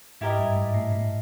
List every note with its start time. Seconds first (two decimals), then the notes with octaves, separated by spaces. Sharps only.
0.21 G#2 E4 G4 A#4 D#5
0.39 G2
0.56 G#2
0.74 A2
0.92 A2